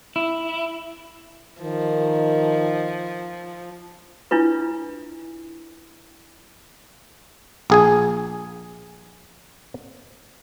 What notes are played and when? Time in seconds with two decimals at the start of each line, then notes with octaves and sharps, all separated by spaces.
0.16 E4
1.62 D#3 F3
4.31 D4 E4 F4 B4
7.70 A#1 G#4 G#5